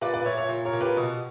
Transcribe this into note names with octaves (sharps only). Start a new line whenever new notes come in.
A#2 B4 D5
B4 D5
A#2 C#5 E5
C#5 E5
A#2
A#4 C#5
A#2
G4 B4
B2